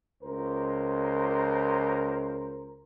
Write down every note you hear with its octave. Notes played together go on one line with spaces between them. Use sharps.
C#2 A#4 C5